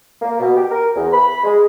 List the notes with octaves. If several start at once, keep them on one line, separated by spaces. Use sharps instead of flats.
A#3
B2
G4
A#4
E2
B5
G#3